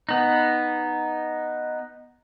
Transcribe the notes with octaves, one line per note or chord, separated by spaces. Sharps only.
B3 D#4